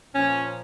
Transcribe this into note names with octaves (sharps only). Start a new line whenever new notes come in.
A#2 F3 C#4